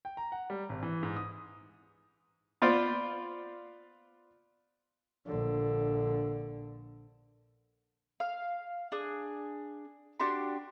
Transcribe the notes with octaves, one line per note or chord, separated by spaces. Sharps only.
G5
A#5
F#5
G3
G#1
E3
G#2
D#6
B3 F4 C5 D5
A#1 D3
F5
D4 G#4
D4 F#4 G4 C6